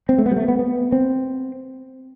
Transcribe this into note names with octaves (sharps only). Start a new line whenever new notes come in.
C4
A3
B3
G3
A3
B3
B3
C4